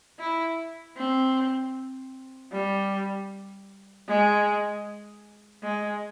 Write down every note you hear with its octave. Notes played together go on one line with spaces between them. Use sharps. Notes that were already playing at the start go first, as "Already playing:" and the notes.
E4
C4
G3
G#3
G#3